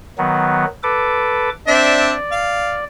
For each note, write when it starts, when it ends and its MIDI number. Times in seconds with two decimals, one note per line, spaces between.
0.18 0.65 51
0.18 0.65 54
0.18 0.65 59
0.83 1.50 69
0.83 1.50 71
0.83 1.50 86
1.68 2.13 60
1.68 2.13 62
1.68 2.85 74
1.68 2.13 76
2.32 2.77 77